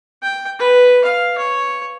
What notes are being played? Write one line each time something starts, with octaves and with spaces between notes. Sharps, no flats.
G5
B4
F5
C#5